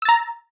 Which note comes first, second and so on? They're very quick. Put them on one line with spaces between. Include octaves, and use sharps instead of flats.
E6 A6 A#5